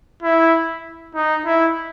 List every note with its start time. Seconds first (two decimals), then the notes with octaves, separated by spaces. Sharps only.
0.22 E4
1.15 D#4
1.46 E4